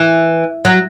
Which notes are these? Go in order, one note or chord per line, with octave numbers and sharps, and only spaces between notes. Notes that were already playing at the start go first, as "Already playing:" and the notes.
Already playing: E3
F#3